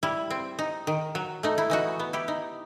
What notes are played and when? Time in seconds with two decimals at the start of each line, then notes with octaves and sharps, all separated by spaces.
0.03 G3 E4
0.30 C4
0.59 D#4
0.87 D#3
1.15 F#3
1.43 A3 D#4
1.58 E4
1.70 E3 D#4 F#4
1.99 B3
2.13 E4 G4
2.28 D#4